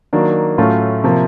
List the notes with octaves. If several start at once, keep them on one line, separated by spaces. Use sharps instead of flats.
D#3 F#3 A#3 D4
A2 F#3 A3 C#4 F4
C3 F3 A#3